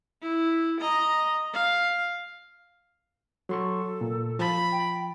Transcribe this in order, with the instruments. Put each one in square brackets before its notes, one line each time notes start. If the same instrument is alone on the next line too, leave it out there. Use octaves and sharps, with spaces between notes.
[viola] E4
D#5 A#5
F5
[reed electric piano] F#3 C6 C#6 [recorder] A4
[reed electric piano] A#2
[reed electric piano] F3 A5 A6 [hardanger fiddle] B5
[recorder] G5